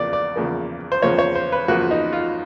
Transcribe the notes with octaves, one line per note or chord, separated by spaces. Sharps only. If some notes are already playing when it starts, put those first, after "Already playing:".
Already playing: E2 C#3 F3 A#3 D5
D5
E2 C#3 F3 A#3
C5
E2 C#3 F3 A#3 C#5
C#5
C5
B4
E2 C#3 F3 A#3 F#4
D#4
F4